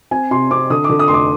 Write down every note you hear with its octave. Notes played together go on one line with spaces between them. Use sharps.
C4 G#5
C3 C6
C4 D6
D3 D#6
D6
D3
D#6
F1 C6
D6